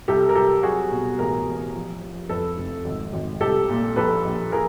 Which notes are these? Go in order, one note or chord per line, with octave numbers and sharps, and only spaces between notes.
C2 G4 A4
A#4
C2 G4 A4
F#3 F#4 G#4
B2
A1 G#4 A#4
A1
F3
F3
F2 A4 B4
F1
G#1
G#1
C2 G4 A4
A#2
A#1 A4 B4
A#1
F3 G#4 A#4